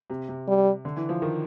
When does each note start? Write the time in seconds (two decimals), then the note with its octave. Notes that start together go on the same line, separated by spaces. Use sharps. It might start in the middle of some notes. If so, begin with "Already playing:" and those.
0.10 C3
0.29 C3
0.48 G3
0.85 D3
0.96 E3
1.09 F3
1.22 D#3